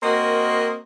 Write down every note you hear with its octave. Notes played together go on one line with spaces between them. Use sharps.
A#3 C4 F#4 A#4 D#5